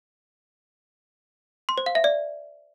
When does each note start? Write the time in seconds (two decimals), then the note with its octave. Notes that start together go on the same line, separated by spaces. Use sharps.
1.69 C6
1.78 C5
1.86 F5
1.95 E5
2.04 D5